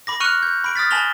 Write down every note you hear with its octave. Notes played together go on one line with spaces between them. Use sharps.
B5 D6 A#6
C#6 F6 F#6 C#7 D#7 F7
G6
B5 D7
D#6 F6 A6 B6
G#5 A5 B5 A#6 F7 G7